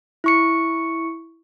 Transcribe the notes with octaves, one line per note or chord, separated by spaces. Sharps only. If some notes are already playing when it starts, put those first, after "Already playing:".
E4 C#6 C#7